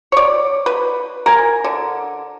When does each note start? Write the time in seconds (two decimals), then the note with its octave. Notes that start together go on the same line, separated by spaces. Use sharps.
0.12 C#5 D5
0.66 B4
1.26 A#4 G#5
1.64 D3